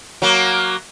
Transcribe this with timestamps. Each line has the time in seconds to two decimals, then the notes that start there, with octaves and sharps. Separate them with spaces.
0.22 F#3 A#3